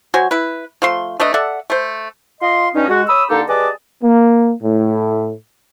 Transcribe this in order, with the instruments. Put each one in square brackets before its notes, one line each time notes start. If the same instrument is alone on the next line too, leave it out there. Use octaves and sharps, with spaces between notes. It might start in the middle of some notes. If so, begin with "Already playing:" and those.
[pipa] F#3 F#4 C5 G#5
E4 B4
F3 A3 C6
A3 D4 B4 D#5
A4 D5 E5 F#5
A3 C5
[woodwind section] F4 D#5 C6
G2 C#4 D#4
G#3 F#4
C#5 B5 D#6 E6
D3 A#3 D#4 G4 A4
G3 G#4 B4 D#5 A5 D6
[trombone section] A#3
A2